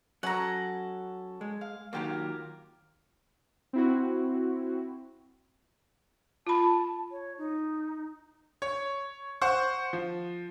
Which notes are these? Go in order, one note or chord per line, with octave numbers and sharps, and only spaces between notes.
F#3 C#4 A4 F#5 A#5
G#3
F5
D#3 F#3 A#3 F4 G4 A#4
C4 E4 F#4
F4 A5 B5
C#5
D#4
C#5
C5 F#5 C#6
F3